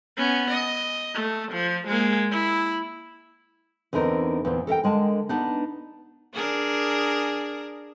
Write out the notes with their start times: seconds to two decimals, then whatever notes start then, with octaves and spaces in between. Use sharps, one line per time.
0.17 B3 C#4
0.50 D#5
1.15 A3
1.52 F3
1.87 G#3 A#3
2.31 E4
3.93 E2 D3 C4 D#4 A#4
4.45 E2 A#2 C4
4.67 A4 A#4 E5 G5
4.84 D3 G#3 A#4 A5
5.29 B3 D4 D#4
6.34 D4 G#4 A#4